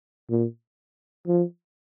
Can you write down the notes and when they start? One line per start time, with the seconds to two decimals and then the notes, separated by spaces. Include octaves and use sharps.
0.30 A#2
1.28 F3